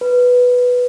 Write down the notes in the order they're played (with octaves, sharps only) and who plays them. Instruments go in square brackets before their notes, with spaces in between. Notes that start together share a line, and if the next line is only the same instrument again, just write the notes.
[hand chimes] B4